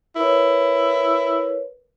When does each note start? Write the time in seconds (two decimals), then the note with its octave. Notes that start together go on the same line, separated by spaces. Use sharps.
0.16 E4 A#4 B4 C#5